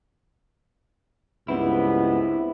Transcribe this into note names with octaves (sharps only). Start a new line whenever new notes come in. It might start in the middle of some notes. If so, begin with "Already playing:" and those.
C#2 G2 B3 C4 E4